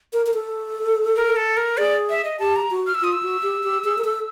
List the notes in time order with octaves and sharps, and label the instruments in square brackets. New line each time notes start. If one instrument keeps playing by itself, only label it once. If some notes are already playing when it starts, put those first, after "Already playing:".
[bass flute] A#4
A#4
A4
[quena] A#4
A4
A#4
[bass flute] G#4 [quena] D5
[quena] E5
D#5
[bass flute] G4 [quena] A5
[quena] A#5
[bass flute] F#4
[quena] F6
E6
[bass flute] F4 [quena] D#6
[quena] E6
[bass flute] F#4
G4
G4
G#4
A#4
A4